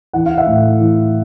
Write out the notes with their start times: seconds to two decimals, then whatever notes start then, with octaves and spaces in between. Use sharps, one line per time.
0.13 E3 F#5
0.26 F5
0.37 E5 F#5
0.46 A2
0.79 E3